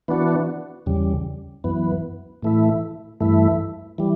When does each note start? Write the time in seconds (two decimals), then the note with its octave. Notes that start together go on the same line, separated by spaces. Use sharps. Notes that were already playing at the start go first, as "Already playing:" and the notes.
0.08 E3 B3 D4 F#4
0.86 E2 C#3 G3
1.64 F#2 E3 B3
2.43 A2 E3 A3 E4
3.21 G2 E3 A3 E4
3.98 E3 G3